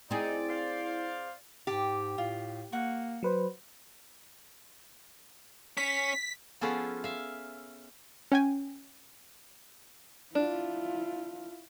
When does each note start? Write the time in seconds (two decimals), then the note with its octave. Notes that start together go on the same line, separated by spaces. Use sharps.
0.11 C4 D#4 E4 G#4 D5
0.49 C5 F5
1.67 G#2 G4 A5
2.18 A2 F4
2.72 A#3 F#5 C#6
3.23 F#3 B4 C5
5.77 C#4 B6
6.61 F3 B3 C#4 F4 G#4 A4
7.04 E5 F5
8.32 C#4 G5 G#5
10.35 D4 E4 F4